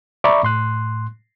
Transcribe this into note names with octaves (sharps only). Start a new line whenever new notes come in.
D5 E5 A#5 B5 C#6 D6
A2 C6 F#6